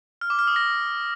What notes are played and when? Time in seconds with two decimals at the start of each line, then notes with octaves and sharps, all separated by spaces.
0.21 F6
0.30 D6
0.39 F6
0.47 D#6
0.56 A#6